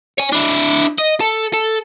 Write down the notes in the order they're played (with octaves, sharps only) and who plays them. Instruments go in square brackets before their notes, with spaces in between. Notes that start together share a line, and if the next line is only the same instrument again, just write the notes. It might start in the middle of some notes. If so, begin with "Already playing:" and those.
[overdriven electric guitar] C#5 G#5
D4 E4
D#5
A4
A4